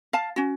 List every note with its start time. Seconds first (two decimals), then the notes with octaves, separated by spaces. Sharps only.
0.13 F5 A5
0.36 C#4 F#4